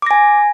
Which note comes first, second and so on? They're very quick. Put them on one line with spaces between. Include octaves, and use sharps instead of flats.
D6 A#6 G#5